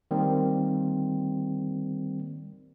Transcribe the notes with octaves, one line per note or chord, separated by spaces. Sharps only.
D#3 G3 A#3 C4